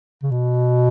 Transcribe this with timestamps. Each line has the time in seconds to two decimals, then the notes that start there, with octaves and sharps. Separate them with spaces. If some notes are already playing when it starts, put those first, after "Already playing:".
0.23 C#3
0.31 B2